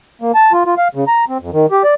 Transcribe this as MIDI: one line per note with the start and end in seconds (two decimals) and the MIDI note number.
0.22 0.32 58
0.35 0.52 81
0.52 0.63 65
0.66 0.75 65
0.78 0.88 77
0.95 1.04 49
1.08 1.25 82
1.29 1.38 60
1.41 1.50 41
1.53 1.66 51
1.71 1.83 67
1.84 1.94 74